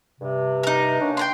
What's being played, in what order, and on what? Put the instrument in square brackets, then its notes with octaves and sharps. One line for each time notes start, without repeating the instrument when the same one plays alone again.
[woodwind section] G2 C3
[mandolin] D#4 A#4
[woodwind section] A#3 C#4 D4
[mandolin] G5 A#5 C6